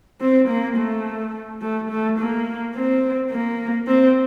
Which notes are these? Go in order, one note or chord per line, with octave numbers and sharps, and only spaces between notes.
C4
A#3
A3
A3
A3
A#3
C4
A#3
C4